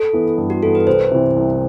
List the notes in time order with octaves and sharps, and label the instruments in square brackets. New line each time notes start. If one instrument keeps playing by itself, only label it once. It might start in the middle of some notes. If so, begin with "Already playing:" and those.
Already playing: [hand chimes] A4
[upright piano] E3 B3
G2
[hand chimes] F#4
[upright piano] E3 B3 [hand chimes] A4
[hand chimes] B4
[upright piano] C2 [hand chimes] C5
[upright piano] C3 E3
C2